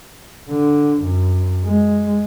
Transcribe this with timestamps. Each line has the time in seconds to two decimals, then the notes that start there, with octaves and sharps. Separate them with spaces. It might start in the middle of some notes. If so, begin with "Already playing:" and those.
0.50 D3
1.02 F#2
1.65 G#3